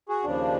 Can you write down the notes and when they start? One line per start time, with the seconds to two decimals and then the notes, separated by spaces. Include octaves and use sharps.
0.09 F#4 G#4
0.24 D#2 C#3 F3 D4